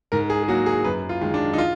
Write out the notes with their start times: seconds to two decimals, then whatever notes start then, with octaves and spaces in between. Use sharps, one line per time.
0.12 G#2 A#4
0.30 G#4
0.43 G#4
0.48 F#3 A#3 F#4
0.66 G#4
0.85 F#2 B4
1.09 F4
1.21 D#3 G#3
1.34 D4
1.53 D#4
1.58 F4